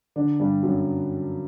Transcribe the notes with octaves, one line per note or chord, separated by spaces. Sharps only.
D3 D4
G2 G3
F#2 F#3